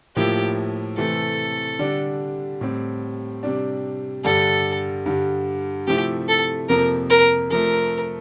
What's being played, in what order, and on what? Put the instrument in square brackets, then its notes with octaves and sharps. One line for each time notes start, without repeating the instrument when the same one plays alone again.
[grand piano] A2 F3 A#3 E4 [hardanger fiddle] G4
[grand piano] C3 E3 A3 C4 [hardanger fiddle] A4
[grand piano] D3 G3 D4
A2 G3 C4
C3 G3 D4
[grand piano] G2 D3 G3 [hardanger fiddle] A4
[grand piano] G2 D3 G3
[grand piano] C3 F3 A3 C4 E4 [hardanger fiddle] G4
[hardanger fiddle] A4
[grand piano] F2 C3 F3 A#3 [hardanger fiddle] A#4
[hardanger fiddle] A#4
[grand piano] C3 F3 A3 [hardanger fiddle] A#4